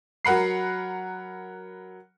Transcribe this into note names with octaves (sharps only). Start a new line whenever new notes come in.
F#3 A#4 F#5 B5 C7